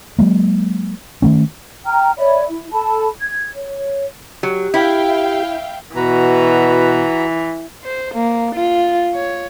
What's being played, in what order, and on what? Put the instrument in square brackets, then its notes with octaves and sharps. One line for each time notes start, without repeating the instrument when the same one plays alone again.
[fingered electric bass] F#3 G#3 A#3
D#3 A3 C#4
[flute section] G5 A#5 F6
C#5 D5 E5 B5
E4
A4 A5 B5
G#6
C#5
[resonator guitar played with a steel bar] F#3 [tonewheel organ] G4
[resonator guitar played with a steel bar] E4 [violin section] E5 F5 G5
[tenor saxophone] B2 [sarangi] E3 [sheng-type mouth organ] F#4 B4 A#5
[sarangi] C5
A#3
F4
C#5